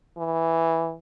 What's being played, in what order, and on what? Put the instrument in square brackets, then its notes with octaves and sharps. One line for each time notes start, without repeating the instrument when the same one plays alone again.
[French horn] E3